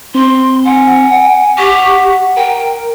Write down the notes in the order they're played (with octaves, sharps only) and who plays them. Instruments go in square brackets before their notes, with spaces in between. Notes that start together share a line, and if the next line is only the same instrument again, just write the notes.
[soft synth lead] C4 [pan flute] C6
[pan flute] F#5 [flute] G#5
[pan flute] G4 [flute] F#5 [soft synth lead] C#6
[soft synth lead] A#4 [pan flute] G5